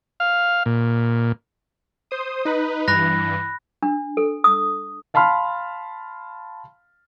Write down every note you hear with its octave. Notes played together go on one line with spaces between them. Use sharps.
F5
A#2
C5 D#6
D#4 B4
G2 E3 B5 F#6 A#6
D4
A4
D#6
F5 A5 B5 C6 F6